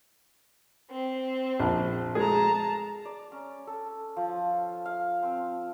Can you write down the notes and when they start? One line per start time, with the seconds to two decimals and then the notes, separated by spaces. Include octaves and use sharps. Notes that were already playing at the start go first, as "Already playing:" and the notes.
0.90 C4
1.59 A#1
2.15 G#3 G#4 A5 A#5
3.05 D5
3.32 C#4
3.67 A4
4.17 F3
4.85 F5
5.23 C4